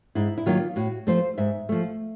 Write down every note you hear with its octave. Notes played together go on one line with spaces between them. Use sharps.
G#2 E4
E4
D#3 F#3 A#3 F4
A2 F#4
F3 A3 C5
G#2 E5
F3 A3